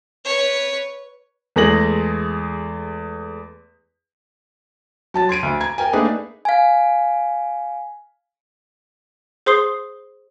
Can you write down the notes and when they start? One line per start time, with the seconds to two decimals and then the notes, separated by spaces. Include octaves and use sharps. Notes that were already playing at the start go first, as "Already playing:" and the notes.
0.25 B4 C#5
1.56 E2 G#3 A3 G#4 A#6 F#7
5.14 F#3 A5 A6
5.29 C6 G#6 D7 D#7
5.43 D2
5.60 A#5 G#6
5.78 A#4 G5 G#5
5.93 A3 A#3 D4 D#4 G#4 B4
6.45 F5 G#5
9.46 G#4 C5 C6 D#6 C7 G7